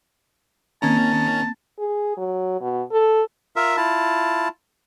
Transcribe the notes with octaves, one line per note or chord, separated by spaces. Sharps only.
D#3 A#3 C4 C#4 A5 A#5 G#6
G#4
F#3
B2
A4
F4 A#4 E5
E4 F4 A5